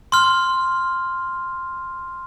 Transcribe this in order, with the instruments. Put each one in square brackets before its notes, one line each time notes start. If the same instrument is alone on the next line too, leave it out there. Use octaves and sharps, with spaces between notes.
[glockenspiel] C6 F6